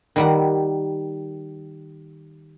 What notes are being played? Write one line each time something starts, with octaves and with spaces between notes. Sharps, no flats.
D#3 G3 F#5